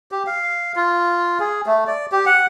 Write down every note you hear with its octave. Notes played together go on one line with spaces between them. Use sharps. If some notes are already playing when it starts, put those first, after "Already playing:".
G4
F5
F4
G#4
A3
D5
G4
F#5